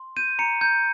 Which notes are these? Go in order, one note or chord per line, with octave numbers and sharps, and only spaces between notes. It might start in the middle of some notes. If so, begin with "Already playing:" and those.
Already playing: C6
G6 D#7
A#5 C#7
A#5 G6